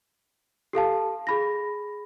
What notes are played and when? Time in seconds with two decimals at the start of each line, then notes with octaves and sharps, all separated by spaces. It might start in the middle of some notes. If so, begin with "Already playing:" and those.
0.73 G4 A4 F5 A5
1.27 G#4 B5 A#6